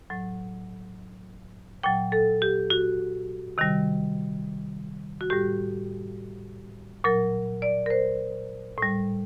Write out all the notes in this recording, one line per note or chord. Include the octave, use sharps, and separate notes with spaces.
A2 F#3
A#2 F#3 G5
A4
G4
F#4
C3 D#3 G3
F#4
A2 G3 G4
A#2 F#3 A#4
D5
A#4
C5
A2 G3